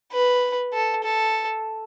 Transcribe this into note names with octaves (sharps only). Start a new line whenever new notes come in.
B4
A4
A4